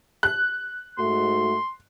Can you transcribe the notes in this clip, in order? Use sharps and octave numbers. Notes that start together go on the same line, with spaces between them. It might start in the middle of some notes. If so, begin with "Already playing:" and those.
F#6
G#2 A3 F#4 C6